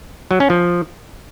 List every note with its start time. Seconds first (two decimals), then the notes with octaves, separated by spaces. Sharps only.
0.31 F#3
0.40 C#4
0.50 F3